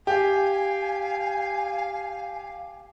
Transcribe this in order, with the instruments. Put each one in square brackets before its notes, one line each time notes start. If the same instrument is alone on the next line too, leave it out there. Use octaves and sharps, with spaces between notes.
[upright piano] G4 [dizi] F5 [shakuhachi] G#5